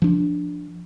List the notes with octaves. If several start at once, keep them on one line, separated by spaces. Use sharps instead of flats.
F3 D4